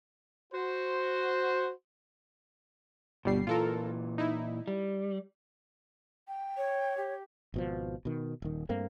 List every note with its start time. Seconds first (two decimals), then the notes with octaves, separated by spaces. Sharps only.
0.53 F#4 C5
3.25 G1 B2 G3 C7
3.47 A#2 E3 F4 A4 A#4
4.18 D#4 E4
4.68 G3
6.28 G5
6.57 C#5
6.97 G4
7.54 G#1 B2 F3
8.05 B2 D#3
8.42 D#1 D#3
8.69 G2 A3 A#3 C4